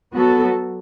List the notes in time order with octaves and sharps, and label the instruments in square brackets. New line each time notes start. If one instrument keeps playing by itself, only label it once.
[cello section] F#3 B3 F#4 A4